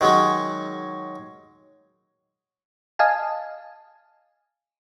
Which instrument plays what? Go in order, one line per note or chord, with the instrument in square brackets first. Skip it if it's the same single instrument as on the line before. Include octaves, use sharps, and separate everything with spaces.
[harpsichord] D#3 F#3 G#3 C#4
[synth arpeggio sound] D#5 F5 G#5 A5